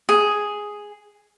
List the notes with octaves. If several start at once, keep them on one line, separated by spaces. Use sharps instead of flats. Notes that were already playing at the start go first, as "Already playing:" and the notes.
G#4